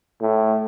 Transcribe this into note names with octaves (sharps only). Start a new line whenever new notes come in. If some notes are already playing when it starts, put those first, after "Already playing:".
A2